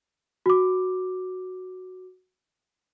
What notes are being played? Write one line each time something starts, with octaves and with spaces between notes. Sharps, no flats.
F#4 D6